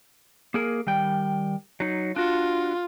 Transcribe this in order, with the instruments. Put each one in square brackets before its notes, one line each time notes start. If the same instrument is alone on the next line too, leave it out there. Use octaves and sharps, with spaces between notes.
[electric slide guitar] A#3 G#4 A#4
D#3 G3 G5
F#3 D#4
[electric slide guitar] D4 F#4 [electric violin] F4